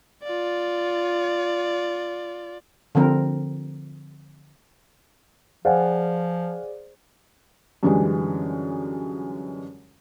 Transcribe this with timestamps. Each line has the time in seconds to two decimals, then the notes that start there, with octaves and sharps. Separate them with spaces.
0.24 F4 D5
2.95 D3 F3 C4 A#4
5.65 F3 G#4 C5 D5 F5 F#5 G#5
7.83 F#2 D3 E3 G3 G#3